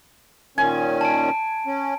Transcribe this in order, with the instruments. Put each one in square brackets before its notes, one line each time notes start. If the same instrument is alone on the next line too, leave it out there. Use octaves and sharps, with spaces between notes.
[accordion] A#2 D#3 C#4 [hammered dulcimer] G#5
[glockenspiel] A5 D7
[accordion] C#4